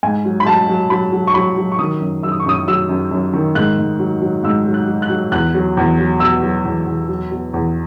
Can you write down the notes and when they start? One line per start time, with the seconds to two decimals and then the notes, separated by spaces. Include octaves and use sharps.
0.03 G#2 G#5
0.25 F#3
0.40 B5
0.46 F#3 A5
0.68 F#3
0.90 F#3 B5
1.12 F#3
1.27 C#6
1.34 F#3 B5
1.58 F#3
1.72 C#6
1.79 D#3 D#6
2.00 F#2
2.23 F#2 E6
2.32 D#6
2.40 C#6
2.45 F#2 D#6
2.67 F#3 E6
2.89 F#2
3.11 F#2
3.33 D#3
3.55 G#2 F#6
3.78 G#2
3.99 F#3
4.22 F#3
4.43 G#2 E6
4.66 F#3
4.74 F#6
4.88 F#3
5.02 F#6
5.10 F#3
5.32 E2 F#6
5.55 F#3
5.77 E2
5.98 F#3
6.20 B2 E6
6.42 F#3
6.65 E2
6.86 E2
7.08 F#3
7.31 B2
7.54 E2